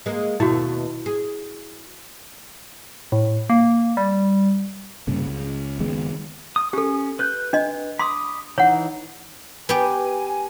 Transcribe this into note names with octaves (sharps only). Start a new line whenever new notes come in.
G#3 A#3
D#2 B2 A3 E4 F#4
G#4
A2
A#3
G3
C2 G2 C#3 A#3
C#2
F#1 D#3 G#3 B3
D#6
C#4 G4 A4
B4 F#6 G6
D4 D#5
B5 C6 D6 D#6
E3 D#4 C#5 F#5
B3 G4 G#5